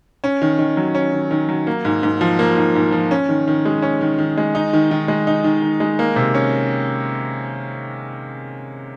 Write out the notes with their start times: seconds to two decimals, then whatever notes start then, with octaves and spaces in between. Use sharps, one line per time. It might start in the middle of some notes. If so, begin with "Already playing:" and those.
0.24 C#4
0.42 D#3
0.59 D#3
0.77 F#3
0.95 C#4
1.13 D#3
1.31 D#3
1.49 F#3
1.67 A#3
1.85 G#2
2.03 G#2
2.21 F3
2.39 A#3
2.57 G#2
2.75 G#2
2.92 F3
3.11 C#4
3.29 D#3
3.47 D#3
3.65 G#3
3.82 C#4
4.01 D#3
4.19 D#3
4.37 G#3
4.55 D#4
4.73 D#3
4.91 D#3
5.08 G#3
5.27 D#4
5.44 D#3
5.62 D#3
5.80 G#3
5.99 A#3
6.16 C3
6.35 C#4